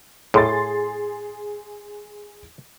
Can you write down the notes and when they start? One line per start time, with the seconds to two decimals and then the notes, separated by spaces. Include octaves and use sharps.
0.34 A2 G#4 C6 A6